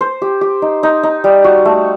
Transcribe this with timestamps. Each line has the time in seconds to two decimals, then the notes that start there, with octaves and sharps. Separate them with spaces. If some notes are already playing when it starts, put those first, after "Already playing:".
0.01 C5
0.22 G4
0.41 G4
0.62 D#4
0.83 D#4
1.03 D#4
1.24 G3
1.44 F#4
1.65 A3